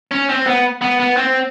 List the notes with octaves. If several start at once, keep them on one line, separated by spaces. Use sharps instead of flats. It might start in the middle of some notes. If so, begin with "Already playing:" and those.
C#4
C4
B3
B3
B3
C4